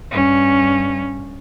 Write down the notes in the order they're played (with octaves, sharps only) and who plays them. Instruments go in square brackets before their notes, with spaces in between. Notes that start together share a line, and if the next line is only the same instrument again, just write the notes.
[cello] G2 C#4